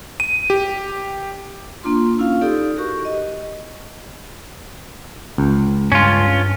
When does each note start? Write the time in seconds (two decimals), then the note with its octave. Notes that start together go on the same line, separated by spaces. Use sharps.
0.20 D#7
0.50 G4
1.83 A#3 D4 F4 C6
2.18 C#4 E4 F4 F5
2.41 D#4 G4 A4 D5
2.77 F#4 G4 A#4 C#6
3.05 D#5
5.38 C#2
5.92 G2 C#4 F4